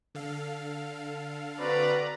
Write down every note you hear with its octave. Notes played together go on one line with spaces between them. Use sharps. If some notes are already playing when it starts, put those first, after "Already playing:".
D3 A4 F5
C4 F#4 B4 D5 A#5